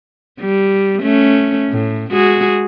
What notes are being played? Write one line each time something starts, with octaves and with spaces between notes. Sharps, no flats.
G3
A3 C#4
A2
G#3 F#4 G#4